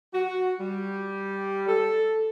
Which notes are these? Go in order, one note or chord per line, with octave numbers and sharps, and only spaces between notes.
F#4
G3
A4